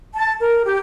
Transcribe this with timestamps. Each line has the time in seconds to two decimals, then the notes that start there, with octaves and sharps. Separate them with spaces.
0.14 A5
0.41 A#4
0.65 G4